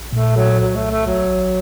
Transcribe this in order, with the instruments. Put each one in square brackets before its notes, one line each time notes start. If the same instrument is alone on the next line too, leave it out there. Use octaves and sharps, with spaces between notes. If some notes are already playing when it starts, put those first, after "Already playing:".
Already playing: [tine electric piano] A#1
[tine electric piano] A#2 [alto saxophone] A3
[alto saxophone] F#3 [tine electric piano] A4
[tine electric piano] C2 [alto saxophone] F#3
[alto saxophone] A3
[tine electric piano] C2
[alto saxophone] A3
[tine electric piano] A1 [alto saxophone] F#3
[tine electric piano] A1